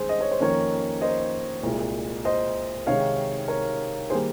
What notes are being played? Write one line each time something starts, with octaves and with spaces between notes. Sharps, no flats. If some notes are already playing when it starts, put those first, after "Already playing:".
Already playing: G#2 D#3 G3 C4 G#4 C5
D#5
C#5
C5
F2 D#3 A#3 C#4 A#4 C#5
C5 D#5
C2 A#2 G#3
C5 D#5
C3 D#3 G#3 D#4 C#5 F5
A#4 C#5
D#3 G3 A#3 G#4 C5